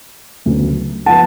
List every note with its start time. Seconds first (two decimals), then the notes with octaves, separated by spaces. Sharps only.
0.46 D2 C#3 F#3 B3
1.06 F3 B3 F#5 A5